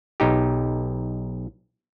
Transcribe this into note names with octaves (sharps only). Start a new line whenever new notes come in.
B1 D#4 G4